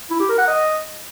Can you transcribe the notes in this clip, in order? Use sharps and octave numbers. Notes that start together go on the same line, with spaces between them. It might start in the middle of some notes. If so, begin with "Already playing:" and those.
E4
G4
A#4
F#5
D#5